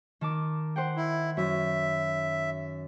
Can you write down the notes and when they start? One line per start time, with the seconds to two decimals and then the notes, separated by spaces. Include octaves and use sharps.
0.21 D#3 A5 D6
0.76 C5 F#5 G5
0.97 E4
1.37 F#2 E5